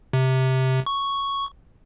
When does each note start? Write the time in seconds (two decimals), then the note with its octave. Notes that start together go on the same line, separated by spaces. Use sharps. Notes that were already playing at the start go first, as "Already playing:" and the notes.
0.13 C3
0.86 C#6